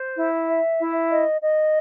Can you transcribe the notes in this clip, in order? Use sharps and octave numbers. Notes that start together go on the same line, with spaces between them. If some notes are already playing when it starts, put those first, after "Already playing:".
Already playing: C5
E4
E5
E4
D#5
D#5